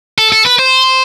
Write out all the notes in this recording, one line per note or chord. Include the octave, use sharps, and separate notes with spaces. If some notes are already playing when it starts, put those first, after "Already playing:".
A4
A4
B4
C5